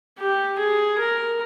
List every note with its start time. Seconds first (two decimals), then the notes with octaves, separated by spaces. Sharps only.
0.19 G4
0.60 G#4
0.99 A#4